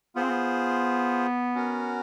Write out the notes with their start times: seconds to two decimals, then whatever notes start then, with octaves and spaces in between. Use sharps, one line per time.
0.15 B3 F4 G#4 C5
0.22 C4
0.30 B3
1.55 C#4 F#4 A#4